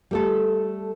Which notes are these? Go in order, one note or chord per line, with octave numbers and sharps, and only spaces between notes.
G3 A3 A4